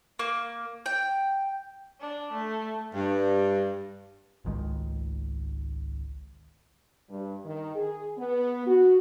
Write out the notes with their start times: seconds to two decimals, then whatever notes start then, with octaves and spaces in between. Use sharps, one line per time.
0.19 A#3
0.86 G5
2.00 D4
2.33 A3
2.94 G2
4.45 G#1 C#2 D#3 G#3
7.10 G2
7.45 D#3
7.75 G#4
8.18 B3
8.67 F#4